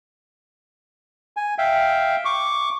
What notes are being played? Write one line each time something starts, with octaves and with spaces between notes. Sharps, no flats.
G#5
E5 F5 G5
C#6 D6